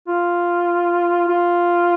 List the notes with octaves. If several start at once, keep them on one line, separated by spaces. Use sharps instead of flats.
F4
F4